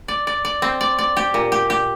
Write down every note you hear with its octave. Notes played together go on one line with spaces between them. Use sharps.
D5
D5
D5
C4
D5
D5
G4
A#2
G4
G4